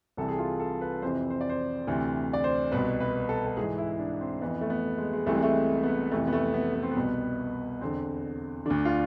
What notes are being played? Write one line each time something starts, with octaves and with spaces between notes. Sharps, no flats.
C2 C3 E3 A4
G#4
F4
A4
B4
F2 C3 E3 C5
C5
D5
C5
D2 C3 E3
D5
C5
C2 B2 B4
B4
A4
A4
G#2 E3 G#4
E4
E4
D4
C4
F2 E3 B3
A3
B3
G#3
G#3
C2 C3 E3 A3
G#3
A3
B3
F2 C3 E3 A3
B3
A3
B3
B3
C4
B3
C2 B2
E2 D3 C4
D2 D3 D4
F4